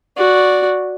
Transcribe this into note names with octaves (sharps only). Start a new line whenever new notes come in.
F#4 D5